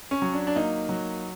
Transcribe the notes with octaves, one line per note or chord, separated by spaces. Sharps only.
C#4
F#3
D4
D4
A#3 D#4
F#3